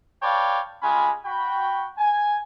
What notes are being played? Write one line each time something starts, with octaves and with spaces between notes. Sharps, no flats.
B4 C#5 D5 F5 G5 A5
G3 G#3 C#4 F4 G#5 B5
F#4 G5 B5
G#5